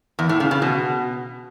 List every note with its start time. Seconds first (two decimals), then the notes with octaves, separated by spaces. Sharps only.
0.19 E2
0.29 A2
0.40 C#3
0.51 C#3
0.62 B2